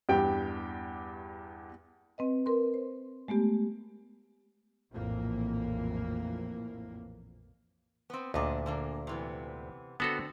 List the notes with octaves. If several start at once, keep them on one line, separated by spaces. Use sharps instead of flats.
E2 G2 G4 G5
C4 B4 D#5
A#4 B4 C6
C5
G#3 A3 B3 G4
A#1 F2 A2 E3 A#3
B3 C4
D2 A#2 D4 D#5
D3 A#3 D4
C3 E3 B3
D3 B3 C4 F#4 A4